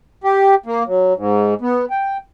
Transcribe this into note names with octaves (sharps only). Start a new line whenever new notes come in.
G4
A#3
F#3
G#2
B3
G5